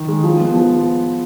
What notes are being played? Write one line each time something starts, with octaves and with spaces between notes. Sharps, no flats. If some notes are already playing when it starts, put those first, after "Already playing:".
Already playing: D#3
G#3
F3
B3
F3